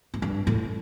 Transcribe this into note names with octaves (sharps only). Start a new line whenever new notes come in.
G#2
G2
A2